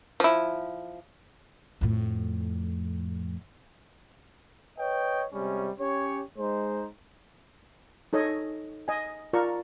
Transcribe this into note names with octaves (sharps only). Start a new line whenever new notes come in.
F3 E4
F2 A2
B4 C#5 D#5 G5
C3 G3 G#3 C#4
C#4 G4 C#5
G#3 D#4 C5
D#4 A4 C#5 D#5
D#5 G#5
F4 A#4 D5 A5 A#5 C#6